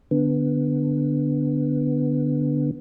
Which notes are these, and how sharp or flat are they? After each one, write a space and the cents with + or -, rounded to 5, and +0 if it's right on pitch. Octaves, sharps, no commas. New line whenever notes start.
D3 +0 B3 +0